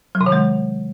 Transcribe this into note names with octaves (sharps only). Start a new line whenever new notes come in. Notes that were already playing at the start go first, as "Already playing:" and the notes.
F#3
C3
D#3
G#3